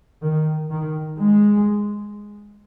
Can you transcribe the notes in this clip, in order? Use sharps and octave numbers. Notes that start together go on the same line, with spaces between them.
D#3
D#3
G#3